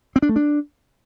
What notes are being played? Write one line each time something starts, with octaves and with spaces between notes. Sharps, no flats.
C4
D4
A3
D4